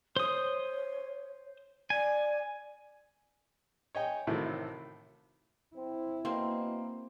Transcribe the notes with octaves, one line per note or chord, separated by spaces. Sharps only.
C5 C#5 D#6
D5 G#5
C#5 D#5 G5 G#5
A1 A2 C3 D#3 F#4 A4
C4 E4
B2 A#3 C4